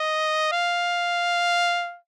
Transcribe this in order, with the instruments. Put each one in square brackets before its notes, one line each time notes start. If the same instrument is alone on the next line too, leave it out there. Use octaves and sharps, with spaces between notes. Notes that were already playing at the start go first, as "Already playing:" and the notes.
Already playing: [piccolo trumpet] D#5
F5